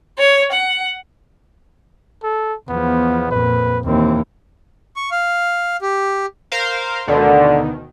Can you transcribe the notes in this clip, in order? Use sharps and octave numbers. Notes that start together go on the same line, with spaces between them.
C#5
F#5
A4
E2 F3 B3
F2 A#2 B4
D#2 E3 C4
C#6
F5
G4
A#4 C5 F5
D2 B2 D3 D#3